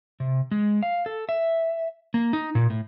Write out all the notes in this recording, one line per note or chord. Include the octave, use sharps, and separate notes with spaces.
C3
G#3
F5
A4
E5
A#3
D#4
A#2
A2